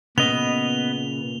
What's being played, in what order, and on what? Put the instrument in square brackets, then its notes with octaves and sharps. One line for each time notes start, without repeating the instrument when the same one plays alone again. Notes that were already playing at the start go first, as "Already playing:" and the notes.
[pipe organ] A#2 [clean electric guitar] C#3 B4 [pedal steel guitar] B3 D#5 [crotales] F7 G7